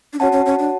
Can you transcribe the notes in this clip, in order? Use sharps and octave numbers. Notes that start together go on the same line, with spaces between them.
D4
C#4 F#4 C#5 F#5 A5
C#4
C#4
D4